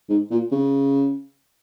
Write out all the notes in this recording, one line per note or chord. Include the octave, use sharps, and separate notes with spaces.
G#2
A#2
C#3